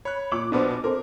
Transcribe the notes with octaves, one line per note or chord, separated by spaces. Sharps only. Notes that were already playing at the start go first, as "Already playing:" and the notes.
C#5 B5 F#6
A#2 D6 F#7
B1 B2 B3 D4 B4 C5
C4 A4 A#4 C5